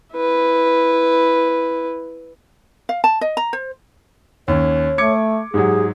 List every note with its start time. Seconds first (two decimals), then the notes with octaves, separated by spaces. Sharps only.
0.15 E4 B4
2.89 F5
3.04 A5
3.21 D#5
3.37 A#5
3.53 C5
4.48 D#2 C#4 C#5
4.98 A3 D6 G#6 C#7
5.54 G#2 F#3 G4 G#4